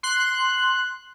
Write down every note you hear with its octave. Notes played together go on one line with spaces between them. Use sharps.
C6 F#6